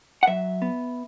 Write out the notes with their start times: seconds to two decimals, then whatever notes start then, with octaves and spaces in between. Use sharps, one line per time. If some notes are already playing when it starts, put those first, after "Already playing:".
0.23 F#5
0.27 F#3 E5
0.62 B3